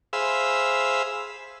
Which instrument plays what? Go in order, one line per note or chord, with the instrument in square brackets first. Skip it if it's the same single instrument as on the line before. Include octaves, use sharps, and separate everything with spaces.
[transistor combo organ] G#4 C5 E5 F5 B5 E6